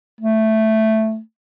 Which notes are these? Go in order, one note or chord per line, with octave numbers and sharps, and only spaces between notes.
A3